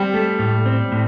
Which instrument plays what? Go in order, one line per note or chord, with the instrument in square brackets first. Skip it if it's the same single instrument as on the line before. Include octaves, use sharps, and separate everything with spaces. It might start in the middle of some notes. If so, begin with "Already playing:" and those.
Already playing: [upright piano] G3 [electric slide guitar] C4
[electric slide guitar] A3
A2
C4
A2